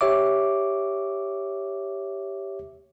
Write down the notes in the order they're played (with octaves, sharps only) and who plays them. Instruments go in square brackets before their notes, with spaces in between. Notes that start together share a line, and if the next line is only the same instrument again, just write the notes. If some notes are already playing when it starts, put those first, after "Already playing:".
[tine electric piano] G4 C#5 E5 D6